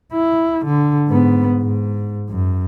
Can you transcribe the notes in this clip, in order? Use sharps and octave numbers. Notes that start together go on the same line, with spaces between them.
E4
D3
G#2 B3
G#2
F#2